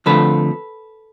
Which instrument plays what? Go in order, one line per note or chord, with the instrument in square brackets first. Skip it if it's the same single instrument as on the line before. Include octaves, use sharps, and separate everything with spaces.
[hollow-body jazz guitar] F2 D3 F3 A3 A4 B4